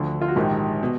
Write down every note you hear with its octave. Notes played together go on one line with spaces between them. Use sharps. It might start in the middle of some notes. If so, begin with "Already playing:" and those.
Already playing: D2 D3 F3
F4
F#4
A#1 G#2 D#3 G4
B2